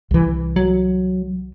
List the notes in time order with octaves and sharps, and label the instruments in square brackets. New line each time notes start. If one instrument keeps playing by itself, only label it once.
[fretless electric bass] C2 E3
[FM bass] F#3